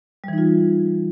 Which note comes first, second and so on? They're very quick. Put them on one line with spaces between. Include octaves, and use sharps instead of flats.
G3 E3 D#4 F4